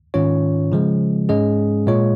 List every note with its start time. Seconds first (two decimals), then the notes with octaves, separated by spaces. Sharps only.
0.14 G#2 D#3 C#4 F4 C#5
0.72 C#3 F3 G#3
1.29 G#2 G#3 C#4 G#4 D#5
1.87 A#2 G#3 F4 C#5